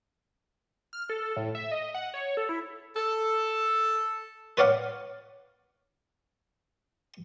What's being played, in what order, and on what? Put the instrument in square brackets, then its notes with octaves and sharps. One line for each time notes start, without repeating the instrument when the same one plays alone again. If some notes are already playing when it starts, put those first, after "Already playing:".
[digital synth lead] F6
A4
A2
E5
D#5
F#5
C#5
A4
E4
[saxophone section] A4
[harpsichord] B4 C#5 D5 F5 F#5